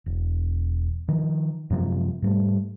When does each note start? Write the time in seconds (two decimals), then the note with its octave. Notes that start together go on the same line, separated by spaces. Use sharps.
0.06 E1
1.08 D#3 F3
1.70 F#2 C3 F3 G#3
2.22 G#2 G3 A3